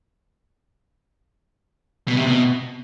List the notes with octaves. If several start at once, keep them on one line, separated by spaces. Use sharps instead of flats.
B2
C3
B2